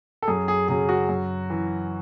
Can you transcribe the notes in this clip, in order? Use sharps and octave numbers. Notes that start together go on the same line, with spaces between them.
A4
F#2 G#4
G#4
C#3 F#3 G#4
F#4
F#2
E3